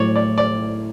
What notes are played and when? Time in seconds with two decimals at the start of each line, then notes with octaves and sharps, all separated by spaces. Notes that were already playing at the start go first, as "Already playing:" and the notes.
Already playing: A2 F#3 A3 C#5 D5
0.16 D5
0.38 D5